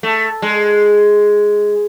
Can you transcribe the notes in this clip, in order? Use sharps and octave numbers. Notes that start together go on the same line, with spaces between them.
A3
G#3